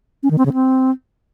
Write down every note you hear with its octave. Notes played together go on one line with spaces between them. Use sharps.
C#4
D#3
C4
C#3
C4